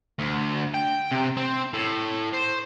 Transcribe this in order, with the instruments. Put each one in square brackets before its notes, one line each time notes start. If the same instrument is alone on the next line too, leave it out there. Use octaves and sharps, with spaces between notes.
[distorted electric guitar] D2
G5
C3
C4
A2
C5